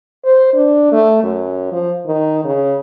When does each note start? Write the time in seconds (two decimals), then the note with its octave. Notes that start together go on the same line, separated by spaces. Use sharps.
0.25 C5
0.54 D4
0.92 A3
1.23 F#2
1.72 F3
2.07 D#3
2.45 C#3